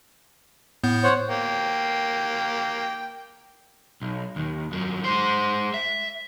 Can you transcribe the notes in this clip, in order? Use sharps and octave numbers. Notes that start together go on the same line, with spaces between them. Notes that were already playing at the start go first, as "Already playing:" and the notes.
A2 B3 G6
C5 C#5 F#5
A#3 G5
B1
D#2
F2 F#3
G#3 C5
E5